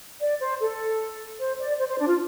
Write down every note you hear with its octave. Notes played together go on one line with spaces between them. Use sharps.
D5
C5
A4
C5
D5
C5
C5
D4
F4